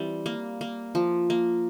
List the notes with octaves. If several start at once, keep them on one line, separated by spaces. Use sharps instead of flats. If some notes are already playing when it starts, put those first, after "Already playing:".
Already playing: E3 G3 C4
A#3
A#3
F3
A#3